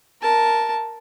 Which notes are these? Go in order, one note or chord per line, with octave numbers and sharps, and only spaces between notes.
A#4 A5